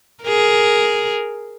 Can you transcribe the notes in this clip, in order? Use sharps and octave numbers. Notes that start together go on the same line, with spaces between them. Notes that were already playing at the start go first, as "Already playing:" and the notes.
G#4 A#4